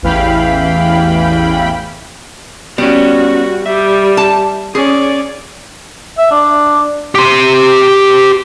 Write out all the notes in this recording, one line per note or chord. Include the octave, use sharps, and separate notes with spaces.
A1 E2 E3 F5 G5 B5
G3 B3 C#4 F#4
G3 E5
A5
C#4 G#4 D5
E5
D4
G4 C6